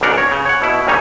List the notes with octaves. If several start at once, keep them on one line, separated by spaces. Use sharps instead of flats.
B1 C#3 D4 A#4 F#5
C#5
C#3
C#5 F#5
B2 E4
D#2 C#3 G3 D#4 C#5